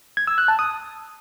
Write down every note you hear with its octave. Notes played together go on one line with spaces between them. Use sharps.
G#6
E6
F#6
A5
D#6